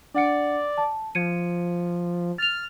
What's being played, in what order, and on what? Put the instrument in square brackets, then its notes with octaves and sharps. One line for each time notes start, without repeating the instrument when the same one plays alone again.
[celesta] D4 F#5 C#7 [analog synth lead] D5
[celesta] A5
[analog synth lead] F3 [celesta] G#6 C#7 D#7
[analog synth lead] F6 [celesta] A6 F7